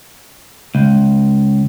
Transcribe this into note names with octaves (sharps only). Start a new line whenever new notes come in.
C#2